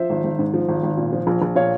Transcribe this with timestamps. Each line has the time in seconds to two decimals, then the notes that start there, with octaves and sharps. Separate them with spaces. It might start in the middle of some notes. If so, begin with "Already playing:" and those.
Already playing: F3 C5 E5
0.10 G#1
0.24 G#1
0.39 G#2
0.54 F3
0.68 G#1
0.83 G#1
0.97 A#2
1.13 F3
1.27 A#1
1.42 A#1
1.55 A#2 C#5 F5